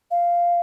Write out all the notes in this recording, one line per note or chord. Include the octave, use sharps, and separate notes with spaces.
F5